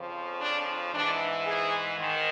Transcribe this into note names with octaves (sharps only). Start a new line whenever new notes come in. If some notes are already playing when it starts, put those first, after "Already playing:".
Already playing: F2 C#3 F3
D4
G#2 E3 D4
G#4
G#2 D#3